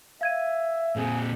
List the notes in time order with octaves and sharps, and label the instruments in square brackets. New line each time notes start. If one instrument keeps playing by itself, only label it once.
[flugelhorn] E5 [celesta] F5 G#6 D#7
[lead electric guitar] A#2 C4 [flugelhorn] G#4